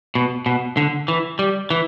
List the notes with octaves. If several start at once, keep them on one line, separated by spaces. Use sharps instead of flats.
B2
B2
D3
E3
G3
E3